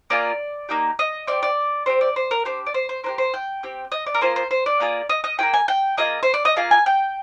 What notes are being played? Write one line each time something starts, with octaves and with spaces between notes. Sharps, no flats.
A#3 F4 G#4 D5
A#3 D#4 G4
D#5
C4 G4 D5
D5
C4 G4 C5
D5
C5
A#4
D4 G4 C5
D5
C5
C5
A#3 D4 G4 C5
C5
G5
C4 G4
D#5
D5
A#4
A#3 F4 G#4 C5
C5
C5
D5
A#3 F4 G#4
D#5
D#5
A#3 F4 G#4 G5
G#5
G5
A#3 F4 G#4 D#5
C5
D5
D#5
A#3 F4 G#4 F5
G#5
G5